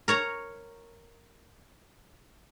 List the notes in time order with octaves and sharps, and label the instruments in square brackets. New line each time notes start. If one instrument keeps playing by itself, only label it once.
[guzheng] A#4 C#5 A#5